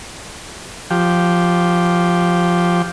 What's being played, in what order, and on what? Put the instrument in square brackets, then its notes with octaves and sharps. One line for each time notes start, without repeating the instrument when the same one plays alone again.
[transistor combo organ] F3 G4